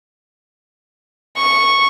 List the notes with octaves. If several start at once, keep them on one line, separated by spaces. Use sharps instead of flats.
C#6